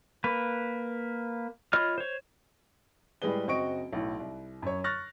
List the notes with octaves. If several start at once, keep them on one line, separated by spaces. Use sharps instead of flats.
A#3 B4
F4 C#5 D#5 B5 F6
C5 C#5
A2 G3 G#3 G#4 B4 G7
F#1 C4 F#4 D#5 C#6 D7
B1 A2
C2
F#2 C#5
C#6 F6 F#6 A6 A#6